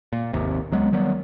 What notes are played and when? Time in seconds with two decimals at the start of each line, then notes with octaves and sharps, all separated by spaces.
0.13 A#2
0.33 G#1 D#2 C3
0.72 C#2 F#3 G#3 B3
0.92 D#3 F#3 G3 B3